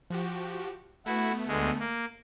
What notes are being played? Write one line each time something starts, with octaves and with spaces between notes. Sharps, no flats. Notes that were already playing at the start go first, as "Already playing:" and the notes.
F3 F#4 G4
A3 B3 E4 F#4
D2 G#3
A#3